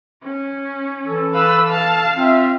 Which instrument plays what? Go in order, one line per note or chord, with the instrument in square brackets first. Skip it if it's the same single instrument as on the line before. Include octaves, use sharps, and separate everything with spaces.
[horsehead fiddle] C#4
[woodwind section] E3 A4
[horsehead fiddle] B4 [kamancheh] F5 E6
[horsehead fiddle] F5 [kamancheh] A5
[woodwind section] C4 E5 [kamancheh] F4